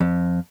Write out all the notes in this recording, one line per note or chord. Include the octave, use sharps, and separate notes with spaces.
F2